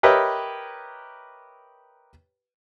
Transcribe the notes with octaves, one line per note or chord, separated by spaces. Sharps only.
G4 A#4 B4 C#5 D#5 E5